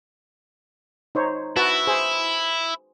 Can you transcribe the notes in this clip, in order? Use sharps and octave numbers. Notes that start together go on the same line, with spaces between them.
D#4 C5 C#5
E4 F#4 B4 A5
G#4 C5